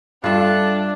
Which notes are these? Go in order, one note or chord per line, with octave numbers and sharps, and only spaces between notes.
G2 D4 F4 A4 E5 F#6